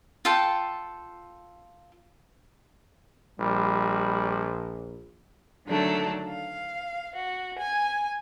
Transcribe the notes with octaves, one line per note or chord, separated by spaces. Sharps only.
F4 A4 G5
A#1 G3
D3 D#3 F#3 A3 D4
F5
F#4
G#5